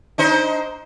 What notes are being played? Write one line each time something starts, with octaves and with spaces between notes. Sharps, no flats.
D4 D#4 C5